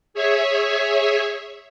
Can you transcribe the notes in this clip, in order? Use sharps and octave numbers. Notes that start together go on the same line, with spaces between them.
G#4 C#5 E5 G#5